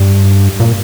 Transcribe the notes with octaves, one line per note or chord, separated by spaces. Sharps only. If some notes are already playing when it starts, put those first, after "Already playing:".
Already playing: G2
A#2